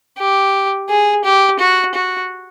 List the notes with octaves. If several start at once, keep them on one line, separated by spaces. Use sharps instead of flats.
G4
G#4
G4
F#4
F#4